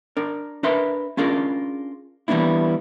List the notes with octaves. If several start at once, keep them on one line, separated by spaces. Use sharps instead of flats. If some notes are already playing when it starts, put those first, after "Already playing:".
D4 A#4
D4 A#4 B4 E5 C6
C#4 D4 F4 G#4 A#4
E3 G3 A#3 B3 D4 E4